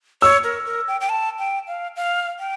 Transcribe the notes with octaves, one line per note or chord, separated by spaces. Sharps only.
C#5 E6
A#4
A#4
G5
G5
A5
G5
F5
F5
G5